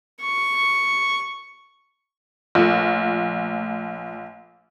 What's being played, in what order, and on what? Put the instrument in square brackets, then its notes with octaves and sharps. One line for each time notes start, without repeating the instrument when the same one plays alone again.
[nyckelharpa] C#6
[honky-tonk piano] A#1 [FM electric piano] F3 A3